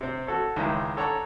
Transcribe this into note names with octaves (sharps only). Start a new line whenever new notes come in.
C3 C4
F#4 A4 C#5
C#2 D#3 G#3 E4 G#4 A#5
A4 C#5 D5 F#5 A#5